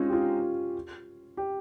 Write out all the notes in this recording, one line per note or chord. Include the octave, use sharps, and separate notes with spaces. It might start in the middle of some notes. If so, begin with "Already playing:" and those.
Already playing: G#3 C4 C#4 D#4 F4
G4
F4
G4